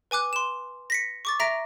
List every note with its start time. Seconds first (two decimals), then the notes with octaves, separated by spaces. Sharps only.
0.11 B4 G#5 D6 F#6
0.33 C6 E7
0.90 A#6 B6 C#7
1.25 C#6 D6 A6
1.40 E5 A#5 A#6 D7